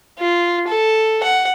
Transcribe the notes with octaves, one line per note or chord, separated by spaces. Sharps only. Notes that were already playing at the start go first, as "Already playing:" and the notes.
F4
A4
F#5